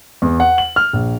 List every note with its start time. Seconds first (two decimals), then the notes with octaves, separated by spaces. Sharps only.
0.22 E2
0.40 F#5
0.58 F#7
0.76 F6
0.93 A#1